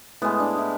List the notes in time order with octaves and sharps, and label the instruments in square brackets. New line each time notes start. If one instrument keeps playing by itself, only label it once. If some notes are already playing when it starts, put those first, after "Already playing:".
[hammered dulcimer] A2 G#3 B3
D4
E4